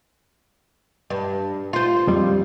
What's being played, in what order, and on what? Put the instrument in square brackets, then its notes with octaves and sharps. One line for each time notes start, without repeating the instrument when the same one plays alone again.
[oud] G2
F4 C5
[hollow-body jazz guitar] F2 G3